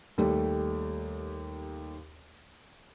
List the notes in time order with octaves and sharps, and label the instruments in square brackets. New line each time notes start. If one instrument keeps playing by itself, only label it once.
[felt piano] D#2 G3 A3